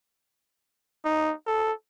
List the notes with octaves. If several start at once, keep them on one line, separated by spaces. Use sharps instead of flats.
D#4
A4